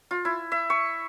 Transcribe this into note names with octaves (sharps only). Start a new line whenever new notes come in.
F4
E4
E5
C#6